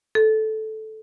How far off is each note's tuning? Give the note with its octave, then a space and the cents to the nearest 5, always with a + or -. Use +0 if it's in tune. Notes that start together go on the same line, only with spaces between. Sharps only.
A4 -10